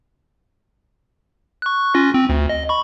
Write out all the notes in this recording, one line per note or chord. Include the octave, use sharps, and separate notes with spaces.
C#6 F#6
C#4 F4 A#6
C4
D2
D#5
B5 C#6